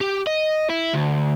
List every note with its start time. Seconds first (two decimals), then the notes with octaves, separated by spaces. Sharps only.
0.01 G4
0.27 D#5
0.70 E4
0.94 D2